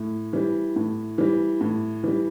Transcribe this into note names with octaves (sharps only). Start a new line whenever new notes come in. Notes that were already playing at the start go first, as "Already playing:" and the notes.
Already playing: A2
E3 G3
A2
E3 G3
A2
E3 G3